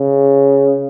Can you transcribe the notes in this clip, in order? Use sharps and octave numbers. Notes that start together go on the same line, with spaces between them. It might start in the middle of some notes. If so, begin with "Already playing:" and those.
Already playing: C#3